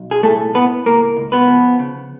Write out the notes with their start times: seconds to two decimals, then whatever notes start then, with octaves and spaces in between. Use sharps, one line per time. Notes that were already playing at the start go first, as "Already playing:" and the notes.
Already playing: B1
0.11 G#4
0.23 A2 A3 A4
0.54 A2 B3 B4
0.86 C#2 A#3 A#4
1.17 C#2
1.32 B3 B4
1.47 F3
1.79 C#3